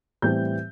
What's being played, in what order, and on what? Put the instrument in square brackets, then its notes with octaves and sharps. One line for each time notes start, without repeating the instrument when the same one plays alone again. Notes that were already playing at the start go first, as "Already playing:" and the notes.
[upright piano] A2 E3 G3 C4 G6